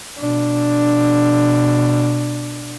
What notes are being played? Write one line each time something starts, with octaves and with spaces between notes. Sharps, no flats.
B2 D4